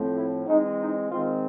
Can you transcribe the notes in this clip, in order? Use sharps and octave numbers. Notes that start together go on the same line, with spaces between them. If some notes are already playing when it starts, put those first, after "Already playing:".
Already playing: A2 F3 A3 C4
E4
E3 G#3 C4 D#4
D#4
D#3 G#3 C4 F4